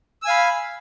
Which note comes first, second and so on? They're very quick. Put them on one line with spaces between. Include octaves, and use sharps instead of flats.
E6 G#5 F5 B5